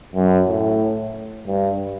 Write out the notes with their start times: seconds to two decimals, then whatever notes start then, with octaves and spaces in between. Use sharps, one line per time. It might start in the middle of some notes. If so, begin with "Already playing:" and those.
0.15 F#2
0.48 A2
1.47 G2